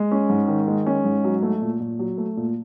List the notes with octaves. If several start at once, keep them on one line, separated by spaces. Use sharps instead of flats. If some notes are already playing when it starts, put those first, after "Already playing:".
Already playing: G#3
C#4
G#2
D#3
G#3
C#4
G#2
F#3
A3
A#2
A#2
F#3
A3
A#2